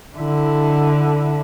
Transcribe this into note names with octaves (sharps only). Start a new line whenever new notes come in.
D3 E4